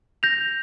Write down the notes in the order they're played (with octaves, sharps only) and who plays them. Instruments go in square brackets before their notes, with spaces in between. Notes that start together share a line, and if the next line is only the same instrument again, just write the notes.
[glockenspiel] G6 A#6 F7